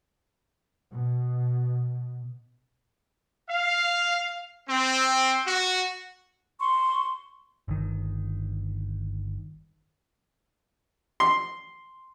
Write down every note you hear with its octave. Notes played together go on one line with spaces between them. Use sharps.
B2
F5
C4
F#4
C6 C#6
G1 D#3
C6